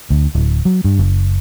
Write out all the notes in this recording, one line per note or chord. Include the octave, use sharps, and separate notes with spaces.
D2
D1
F#3
G2
F#1